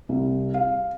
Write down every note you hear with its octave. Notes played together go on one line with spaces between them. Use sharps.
C2
F5